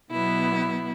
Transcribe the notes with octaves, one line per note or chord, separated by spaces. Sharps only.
B2 F#3 B3 E4